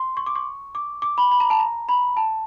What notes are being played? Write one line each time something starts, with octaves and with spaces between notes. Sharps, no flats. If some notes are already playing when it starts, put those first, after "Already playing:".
Already playing: C6
C#6
D6
C#6
D6
D6
B5
B5
A#5
A5
A#5
B5
A5